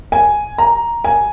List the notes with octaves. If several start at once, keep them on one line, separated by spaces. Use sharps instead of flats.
G#5
A#5
G#5